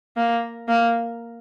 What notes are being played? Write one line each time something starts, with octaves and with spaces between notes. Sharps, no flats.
A#3
A#3